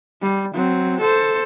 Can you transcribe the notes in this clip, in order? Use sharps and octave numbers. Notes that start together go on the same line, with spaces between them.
G3
F#3 C4
A4 C5